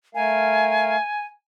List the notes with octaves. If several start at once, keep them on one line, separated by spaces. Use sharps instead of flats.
A3 A#4 F5 G#5